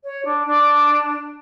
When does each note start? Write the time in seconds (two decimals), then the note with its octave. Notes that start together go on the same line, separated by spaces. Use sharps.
0.03 C#5
0.24 D4
0.46 D4